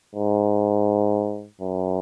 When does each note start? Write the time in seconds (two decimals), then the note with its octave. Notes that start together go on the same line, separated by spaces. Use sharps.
0.15 G#2
1.61 F#2